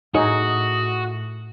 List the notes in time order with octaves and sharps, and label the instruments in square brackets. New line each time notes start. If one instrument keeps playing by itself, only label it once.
[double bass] A2 [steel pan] D#4 G#4 C#5 [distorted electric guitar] F#4 [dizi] D#6